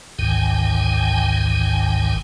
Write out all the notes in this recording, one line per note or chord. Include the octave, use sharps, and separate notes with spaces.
A1 D2 G#2 D#3 G5 G#5